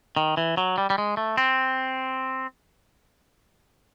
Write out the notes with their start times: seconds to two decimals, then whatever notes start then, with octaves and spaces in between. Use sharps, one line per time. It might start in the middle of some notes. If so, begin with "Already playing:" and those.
0.17 D#3
0.37 E3
0.57 F#3
0.78 G3
0.90 G3
0.98 G#3
1.17 A3
1.38 C4